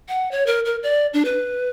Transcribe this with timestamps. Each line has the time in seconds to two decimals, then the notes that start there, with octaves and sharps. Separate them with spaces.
0.08 F#5
0.31 C#5
0.46 A#4
0.66 A#4
0.83 D5
1.13 D4
1.25 B4